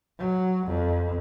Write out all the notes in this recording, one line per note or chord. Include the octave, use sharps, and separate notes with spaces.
F#3
F2